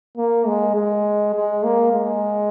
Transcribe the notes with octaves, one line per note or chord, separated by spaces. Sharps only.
A#3
G#3
G#3
G#3
A#3
G#3